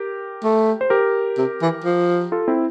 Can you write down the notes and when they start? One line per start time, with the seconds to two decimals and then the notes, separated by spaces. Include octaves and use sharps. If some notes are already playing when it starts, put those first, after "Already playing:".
Already playing: G4 A#4
0.44 A3
0.81 C5
0.90 G4 A#4
1.38 C3
1.61 E3
1.84 F3
2.32 F4 A4
2.48 C4 E4